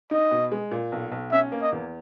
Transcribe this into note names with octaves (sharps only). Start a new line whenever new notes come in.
D#4 D#5
B2
G#3
A#2
B1
B1
C#4 E5
A#3
D#5
E2